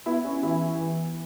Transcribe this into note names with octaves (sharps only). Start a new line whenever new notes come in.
B3 E4
C#4
E3 E4
E3